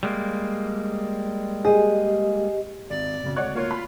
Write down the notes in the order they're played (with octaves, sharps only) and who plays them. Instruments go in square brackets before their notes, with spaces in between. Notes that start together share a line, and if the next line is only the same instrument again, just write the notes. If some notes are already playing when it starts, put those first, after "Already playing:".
[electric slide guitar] G3 G#3 A#3
[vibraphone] G4 D#5 [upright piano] G#4
[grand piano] G#1 [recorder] D5
[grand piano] F#1 B1 C#3
[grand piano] D1 G#3 F#6 [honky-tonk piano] C#5 D5 F#5
[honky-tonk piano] A#3 C#5 [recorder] F4
[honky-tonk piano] B5